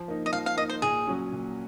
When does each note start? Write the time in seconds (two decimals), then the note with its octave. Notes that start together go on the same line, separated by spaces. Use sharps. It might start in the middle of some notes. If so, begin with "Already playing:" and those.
Already playing: F3
0.08 A#3 D#4
0.26 D#5
0.33 F3 F5
0.46 F5
0.57 A#3 D#5
0.61 D#4
0.69 C5
0.82 A#2 G#4
1.07 F#3 C#4
1.32 A#2